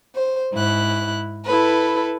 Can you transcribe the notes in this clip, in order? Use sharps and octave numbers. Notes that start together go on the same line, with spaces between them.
C5
G#2 E4 F#6
E4 A4 B4